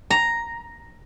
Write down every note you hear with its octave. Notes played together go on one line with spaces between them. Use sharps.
A#5